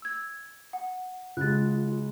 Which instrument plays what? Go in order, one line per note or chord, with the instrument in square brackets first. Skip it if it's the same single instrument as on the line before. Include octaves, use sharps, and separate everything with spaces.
[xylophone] E6 G#6
F#5
[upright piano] C#3 G#3 [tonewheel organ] F4 [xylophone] F#6 A6